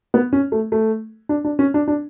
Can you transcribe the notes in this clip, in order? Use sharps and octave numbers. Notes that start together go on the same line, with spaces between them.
B3
C#4
A3
A3
D4
D4
C#4
D4
D4